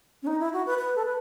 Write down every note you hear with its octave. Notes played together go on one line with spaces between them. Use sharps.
C#4
D#4
E4
F#4
B4
B4
A4
B4